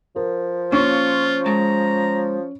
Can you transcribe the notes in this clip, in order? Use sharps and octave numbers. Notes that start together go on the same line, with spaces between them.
F3 A#4
A#3 C#4 F4 C#6
G#3 A5 A#5